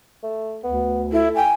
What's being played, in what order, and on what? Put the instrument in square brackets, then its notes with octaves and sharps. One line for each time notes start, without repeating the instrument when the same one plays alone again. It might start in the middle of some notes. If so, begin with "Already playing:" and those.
[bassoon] A3
[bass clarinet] D2 [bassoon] B3
[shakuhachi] E4 [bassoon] A4
[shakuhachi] G5 [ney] G#5